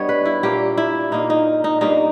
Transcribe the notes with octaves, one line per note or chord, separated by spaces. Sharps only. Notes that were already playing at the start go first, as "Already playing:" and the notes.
Already playing: G2 G3 B3 C#5 D#5
B4
E4
A#2 A#3 G4
E4
A#2 A#3 D#4
D#4
D#4
G2 G3 A#3 D#4